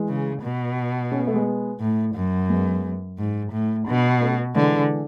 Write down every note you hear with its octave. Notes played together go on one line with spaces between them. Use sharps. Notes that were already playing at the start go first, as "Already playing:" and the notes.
Already playing: E3 G#3
C#3
B2
C#4
B3
A3
G#3 B3
A2
F#2
G#3 B3
G#2
A2
B2 B3 D4
A3 C#4
D3 E3 G#3